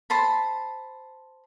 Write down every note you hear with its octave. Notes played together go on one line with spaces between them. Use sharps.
C5 A5 B5